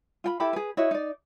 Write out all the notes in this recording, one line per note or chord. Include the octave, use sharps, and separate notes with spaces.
F4 G5 B5
E4 G4 A4 B5
G#4 B4
E4 F#4 C#5 D#5
D#4 D5